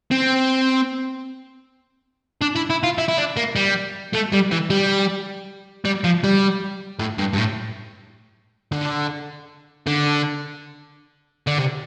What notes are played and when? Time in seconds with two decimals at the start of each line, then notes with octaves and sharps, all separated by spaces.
0.11 C4
2.42 D4
2.56 E4
2.70 E4
2.83 F4
2.98 E4
3.08 E4
3.18 D4
3.37 A#3
3.56 G3
4.13 A3
4.32 G3
4.51 E3
4.70 G3
5.85 G3
6.04 F3
6.24 G3
6.99 A2
7.18 G2
7.33 G2
7.38 A2
8.72 D3
9.87 D3
11.47 D3
11.58 C3